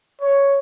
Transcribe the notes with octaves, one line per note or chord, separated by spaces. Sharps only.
C#5